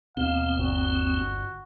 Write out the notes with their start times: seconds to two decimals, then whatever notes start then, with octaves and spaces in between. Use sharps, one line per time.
0.17 D#2 B2 C4 F5
0.57 G1 F#4